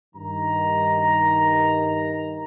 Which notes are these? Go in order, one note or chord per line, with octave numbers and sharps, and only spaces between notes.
G2 D#3 A#5